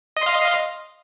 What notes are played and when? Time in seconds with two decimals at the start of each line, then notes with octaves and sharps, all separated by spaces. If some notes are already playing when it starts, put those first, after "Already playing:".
0.17 D#5
0.21 C6
0.26 F5